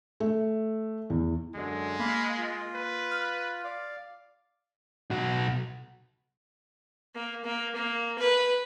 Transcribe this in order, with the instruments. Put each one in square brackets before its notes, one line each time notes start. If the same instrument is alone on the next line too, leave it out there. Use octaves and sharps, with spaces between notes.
[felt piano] A3
E2
[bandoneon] F#2 D3 [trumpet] G#3
[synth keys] A#3 [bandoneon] F5 B5
[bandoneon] F4
[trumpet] B4
[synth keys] F6
[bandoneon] D5 F5
[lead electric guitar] B1 F#4
[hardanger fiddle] A#3
A#3
A#3
B4